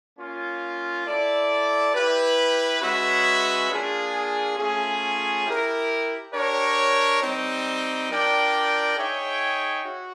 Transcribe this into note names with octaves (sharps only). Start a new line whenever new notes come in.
A#3 C#4 F4
E4 A4 D5
E4 G4 B4
G#3 C#4 F#4 B4 E5
A#3 D4 F4 G#4
A3 C#4 F4 G#4
E4 G4 A#4
D4 G4 A#4 C#5
G3 C4 D#4
D4 F4 A#4 D5 G5
D#4 G#4 C#5 E5 G5
F#4